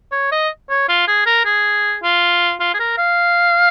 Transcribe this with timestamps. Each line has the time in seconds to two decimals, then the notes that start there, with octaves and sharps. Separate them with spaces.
0.12 C#5
0.32 D#5
0.70 C#5
0.89 F4
1.08 G#4
1.26 A#4
1.45 G#4
2.03 F4
2.60 F4
2.74 G#4
2.79 A#4
2.98 F5